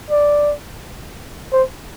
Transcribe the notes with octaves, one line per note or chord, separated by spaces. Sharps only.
D5
C5